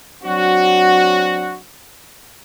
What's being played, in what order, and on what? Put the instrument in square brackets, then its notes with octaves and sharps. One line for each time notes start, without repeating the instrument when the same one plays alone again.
[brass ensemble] F#3 C4 D4 F#4